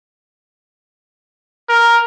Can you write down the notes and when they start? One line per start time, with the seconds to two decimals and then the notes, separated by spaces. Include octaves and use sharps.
1.69 A#4